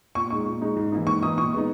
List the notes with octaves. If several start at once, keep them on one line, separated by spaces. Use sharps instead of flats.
A#2 C#6
G#3 D#4 C#6
A#2
G#3 D#4
G#2
E3 A#3 D#4
G#2 C#6
E3 A#3 D#4 D#6
A#2 C#6
G#3 B3 D#4